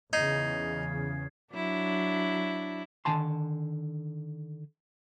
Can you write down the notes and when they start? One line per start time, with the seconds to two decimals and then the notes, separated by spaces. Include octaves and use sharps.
0.13 E2 C#3 D#4 G#6 C7
1.52 F#3 D4 E4
3.05 D3 D#3 G#5 A5 C6